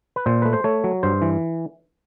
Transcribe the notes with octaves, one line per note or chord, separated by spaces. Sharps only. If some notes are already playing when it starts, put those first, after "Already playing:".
B4
A#2 C5
A3 B4
C5
A3 C#5
F#3
G2 C5
E3